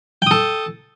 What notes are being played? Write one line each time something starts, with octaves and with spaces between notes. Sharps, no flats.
A4 G5 D#6